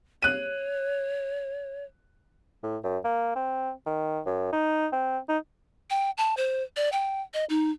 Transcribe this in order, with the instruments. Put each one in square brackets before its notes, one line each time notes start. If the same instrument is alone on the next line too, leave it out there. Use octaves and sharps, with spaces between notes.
[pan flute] C#5 [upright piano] F#6 D#7
[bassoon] A2
F#2
A#3
C4
D#3
F#2
D#4
C4
D#4
[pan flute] G5
A5
C5
D5
G5
D#5
D#4